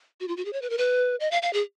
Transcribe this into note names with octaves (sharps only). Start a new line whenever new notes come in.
F#4
F4
F#4
G#4
C#5
B4
A#4
B4
D#5
F5
F5
G#4